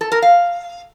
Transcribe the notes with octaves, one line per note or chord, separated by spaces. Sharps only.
A4
A#4
F5